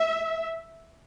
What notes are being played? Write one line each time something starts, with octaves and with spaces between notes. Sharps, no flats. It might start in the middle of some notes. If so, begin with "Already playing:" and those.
Already playing: E5